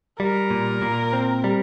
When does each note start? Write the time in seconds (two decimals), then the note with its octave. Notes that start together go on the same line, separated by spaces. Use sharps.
0.20 G3 A#4
0.51 A#2
0.82 A#2
1.13 C4
1.44 G3